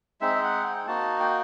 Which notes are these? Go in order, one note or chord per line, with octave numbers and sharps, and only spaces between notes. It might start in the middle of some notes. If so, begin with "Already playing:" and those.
G#3 C4 D#4 E5
F#5
G5
A#3 D#4 F#4 A5
G5